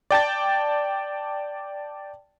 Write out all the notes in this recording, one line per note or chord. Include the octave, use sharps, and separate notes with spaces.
D5 G5 A5 A6